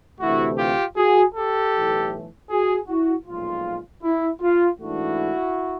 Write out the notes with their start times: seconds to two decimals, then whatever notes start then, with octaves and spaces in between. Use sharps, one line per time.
0.20 D2 C3 E3 A3 E4 F#4
0.58 F4 G4
0.97 F#4 G#4
1.35 G4 A4
1.73 B1 A2 E3 A3
2.50 F#4 G#4
2.88 E4 F#4
3.26 B1 A#2 F3 G#3 F4
4.03 E4
4.42 F4
4.80 G#2 E3 A3 D4 E4 F#4